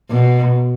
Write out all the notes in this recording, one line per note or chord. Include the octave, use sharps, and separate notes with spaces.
B2